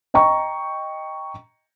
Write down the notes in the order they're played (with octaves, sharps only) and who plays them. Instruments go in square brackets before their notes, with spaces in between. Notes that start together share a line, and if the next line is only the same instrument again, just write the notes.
[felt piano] D#5 G5 A#5 C#6